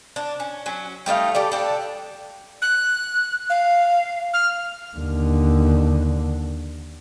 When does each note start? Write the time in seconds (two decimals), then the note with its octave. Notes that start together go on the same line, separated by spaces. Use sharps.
0.16 D4
0.40 C#4
0.66 F#3 C#4
1.06 G3 A3 D#4 F5
1.35 G4 A4 D5
1.52 D4 G4 A4
2.62 F#6
3.50 F5
4.34 F6
4.97 D#2 D3